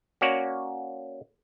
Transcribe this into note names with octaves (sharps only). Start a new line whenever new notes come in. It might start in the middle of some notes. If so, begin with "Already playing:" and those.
A#3 C#4 F#4 C#5 D5 F#5